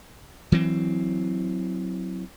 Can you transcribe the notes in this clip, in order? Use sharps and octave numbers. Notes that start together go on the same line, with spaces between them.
E3 F#3 C4